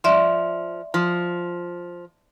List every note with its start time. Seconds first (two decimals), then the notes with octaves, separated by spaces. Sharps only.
0.04 F3 D5 E5 C6
0.94 F3